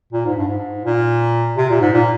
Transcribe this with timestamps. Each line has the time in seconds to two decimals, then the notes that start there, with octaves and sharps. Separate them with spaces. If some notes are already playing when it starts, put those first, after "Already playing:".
0.13 A#2
0.25 G#2
0.37 G2
0.48 G#2
0.85 A#2
1.57 C3
1.70 A#2
1.81 G#2
1.93 A#2